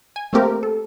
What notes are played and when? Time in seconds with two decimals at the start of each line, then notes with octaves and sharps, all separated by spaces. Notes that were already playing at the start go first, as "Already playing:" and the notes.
0.16 G#5
0.33 A3 A#3 C4 G4 A#4
0.63 A4